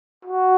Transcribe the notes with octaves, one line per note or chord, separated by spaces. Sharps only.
F#4